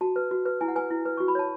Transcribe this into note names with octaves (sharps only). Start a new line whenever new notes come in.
F#4 A5
B4
F#4
B4
E4 G#5
F#5
B4 G#5
E4
B4
F#4 C#6
B5
C#5 A5